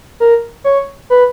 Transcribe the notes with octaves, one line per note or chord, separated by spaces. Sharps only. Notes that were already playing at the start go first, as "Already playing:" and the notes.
A#4
C#5
B4